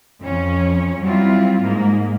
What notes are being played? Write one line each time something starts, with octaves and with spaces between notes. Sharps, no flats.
F2 C#4 C#5
F#3 G3 C4 E4 F4
G#2 A#3